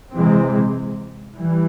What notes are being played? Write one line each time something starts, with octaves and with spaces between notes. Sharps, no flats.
C3 E3 G#3 C4
E3 G3